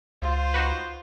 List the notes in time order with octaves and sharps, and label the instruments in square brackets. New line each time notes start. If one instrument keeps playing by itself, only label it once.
[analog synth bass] C#2 [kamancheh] F4 [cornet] C5
[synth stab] D#4 F#4 B4